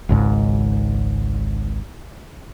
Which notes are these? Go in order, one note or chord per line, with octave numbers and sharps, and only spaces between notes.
G#1 C#2 G#2